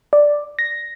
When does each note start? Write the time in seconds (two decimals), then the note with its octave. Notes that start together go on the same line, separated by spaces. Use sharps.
0.13 D5
0.59 A#6